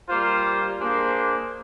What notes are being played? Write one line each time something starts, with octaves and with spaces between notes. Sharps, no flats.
G3 A#3 F4 C5
A#3 D4 G#4 C5